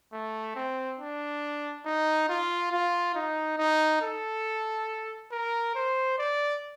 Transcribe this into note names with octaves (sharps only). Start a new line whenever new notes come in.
A3
C4
D4
D#4
F4
F4
D#4
D#4
A4
A#4
C5
D5